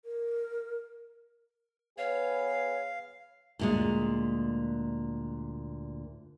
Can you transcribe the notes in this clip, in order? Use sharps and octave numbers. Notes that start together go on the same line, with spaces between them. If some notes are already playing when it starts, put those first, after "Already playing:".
A#4
B3 G#4 B4 C#5 F5
D2 A#2 G#3